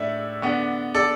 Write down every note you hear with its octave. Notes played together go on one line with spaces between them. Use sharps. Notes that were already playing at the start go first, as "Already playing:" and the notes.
Already playing: A2 A3 D4 D5 E5
D3 B3 D4
A4 D5